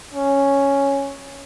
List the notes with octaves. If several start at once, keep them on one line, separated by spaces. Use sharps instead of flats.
C#4